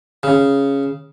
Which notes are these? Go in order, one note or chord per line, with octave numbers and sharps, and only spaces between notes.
C#3